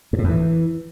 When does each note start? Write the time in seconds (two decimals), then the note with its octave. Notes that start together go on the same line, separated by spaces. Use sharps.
0.13 G2
0.18 A2
0.24 E2
0.29 E3